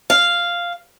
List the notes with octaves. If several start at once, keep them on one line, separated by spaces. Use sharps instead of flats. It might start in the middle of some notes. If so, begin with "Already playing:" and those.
F5